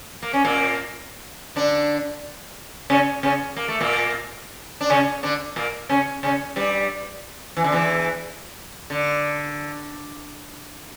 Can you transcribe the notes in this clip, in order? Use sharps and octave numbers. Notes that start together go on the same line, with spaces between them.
A#3
C#4
A#2 A#3
D3 D4
C#3 C#4
C#3 C#4
A#3
A3
A#2 A#3
D4
C#3 C#4
D3 D4
A#2 A#3
C#3 C#4
C#3 C#4
G2 G3
E3
D3
E2 E3
D3